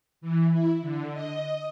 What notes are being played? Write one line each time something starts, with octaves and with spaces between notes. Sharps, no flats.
E3
E4
D3
D#5